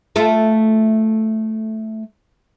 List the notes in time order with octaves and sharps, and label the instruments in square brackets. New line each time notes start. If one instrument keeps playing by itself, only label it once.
[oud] A3 F4 A4